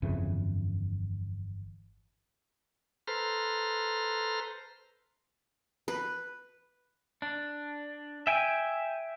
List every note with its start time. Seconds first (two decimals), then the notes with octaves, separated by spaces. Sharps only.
0.02 G1 F2 C#3 E3
3.08 A4 B4 C5 A#5 C6 F6
5.88 B4
7.22 D4
8.27 E5 G5 G#5